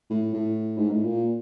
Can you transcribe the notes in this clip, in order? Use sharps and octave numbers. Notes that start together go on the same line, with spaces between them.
A2
A2
G#2
A2
A#2